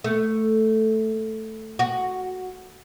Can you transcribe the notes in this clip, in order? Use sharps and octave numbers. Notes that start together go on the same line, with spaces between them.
A3
F#4